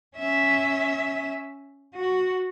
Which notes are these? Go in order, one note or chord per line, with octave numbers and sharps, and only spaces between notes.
C#4 E5
F#4